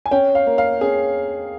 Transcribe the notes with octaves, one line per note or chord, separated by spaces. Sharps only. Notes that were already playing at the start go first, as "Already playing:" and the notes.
G#5
C#4 G5
F5
A#3
F5
C#4 G#4